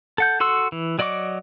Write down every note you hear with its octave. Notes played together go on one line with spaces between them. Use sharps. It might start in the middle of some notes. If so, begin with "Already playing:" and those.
A4 F#5 G6
F#4 A4 C6 E6
E3
F#3 D5 D#5 C#6 D6